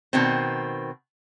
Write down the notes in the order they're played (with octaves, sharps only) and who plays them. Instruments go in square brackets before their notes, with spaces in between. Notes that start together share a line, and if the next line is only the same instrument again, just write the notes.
[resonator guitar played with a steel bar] B2 D#3 C4